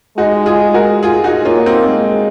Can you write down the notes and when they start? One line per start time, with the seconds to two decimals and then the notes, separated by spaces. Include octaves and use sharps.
0.18 G#3 D#4 F#4
0.46 F4 G#4
0.74 F#4 A#4
1.03 F4 G#4
1.24 D#4 F#4
1.45 A#3 C#4 F4
1.66 C4 D#4
1.88 G#3